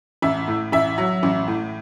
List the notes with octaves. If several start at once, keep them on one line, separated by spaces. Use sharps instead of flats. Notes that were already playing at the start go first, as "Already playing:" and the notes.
A1 E5
A2
A1 E5
F#3
A1
A2